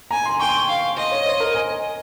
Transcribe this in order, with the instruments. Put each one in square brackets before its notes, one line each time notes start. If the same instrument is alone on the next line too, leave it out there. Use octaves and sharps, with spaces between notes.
[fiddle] G#5 [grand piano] A#5
[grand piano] C6
[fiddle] G5 [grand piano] C#6
[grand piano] C6
C#6
[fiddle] F5
[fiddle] D#5 [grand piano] C6
[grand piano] C#5
C5
A#4
G#5